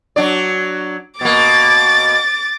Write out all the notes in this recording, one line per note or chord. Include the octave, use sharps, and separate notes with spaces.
F#3 D4 D5
B2 A#3 D6 A6